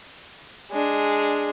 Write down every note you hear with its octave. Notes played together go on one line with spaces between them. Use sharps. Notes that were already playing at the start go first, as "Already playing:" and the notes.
G#3 D4